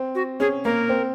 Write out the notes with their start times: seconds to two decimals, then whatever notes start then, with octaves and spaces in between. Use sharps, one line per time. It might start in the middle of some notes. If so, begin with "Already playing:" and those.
Already playing: C4
0.15 F#4
0.40 C#4 G#4
0.65 A#3 A#4
0.89 C4